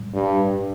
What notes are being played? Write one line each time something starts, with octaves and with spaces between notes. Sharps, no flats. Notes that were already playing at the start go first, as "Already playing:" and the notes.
Already playing: A2 G3
G2